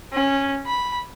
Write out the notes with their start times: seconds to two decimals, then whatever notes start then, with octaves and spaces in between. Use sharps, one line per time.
0.13 C#4
0.66 B5